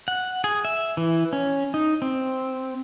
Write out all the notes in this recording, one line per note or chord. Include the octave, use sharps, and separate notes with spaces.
F#5
G#4
E5
E3
C#4
D#4
C4